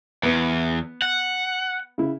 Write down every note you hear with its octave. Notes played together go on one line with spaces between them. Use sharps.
E2 B3
F#5
C#3 E4